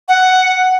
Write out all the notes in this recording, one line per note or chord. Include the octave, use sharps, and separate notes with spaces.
F#5